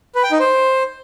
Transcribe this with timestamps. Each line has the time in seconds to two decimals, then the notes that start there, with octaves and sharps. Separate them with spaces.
0.15 B4
0.23 G5
0.32 D#4
0.40 C5